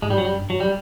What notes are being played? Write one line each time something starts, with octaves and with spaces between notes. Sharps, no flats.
G#2 G#3
G3
G2 F#3
G3
F#2
G2
F#3
G3